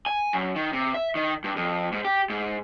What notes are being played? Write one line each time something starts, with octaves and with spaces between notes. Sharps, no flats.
G#5
F#2
D#3
C3
E5
D#3
G2
F2
G#2
G4
G#2